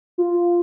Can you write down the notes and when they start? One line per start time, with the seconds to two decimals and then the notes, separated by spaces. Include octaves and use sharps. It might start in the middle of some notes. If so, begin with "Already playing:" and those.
0.18 F4